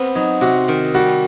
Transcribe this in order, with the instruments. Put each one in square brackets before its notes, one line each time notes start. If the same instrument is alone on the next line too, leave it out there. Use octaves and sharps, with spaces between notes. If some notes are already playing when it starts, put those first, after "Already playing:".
Already playing: [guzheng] B3 [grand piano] C4
[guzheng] F#3 [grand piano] D#4
[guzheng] C3 [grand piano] F#4
[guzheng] D#3
[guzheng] G3 [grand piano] F#4